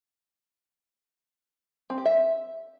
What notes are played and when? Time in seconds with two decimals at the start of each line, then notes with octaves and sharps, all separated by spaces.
1.90 C4
1.98 G4
2.05 E5